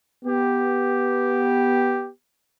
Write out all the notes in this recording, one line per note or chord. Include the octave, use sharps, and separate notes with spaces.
B3 G4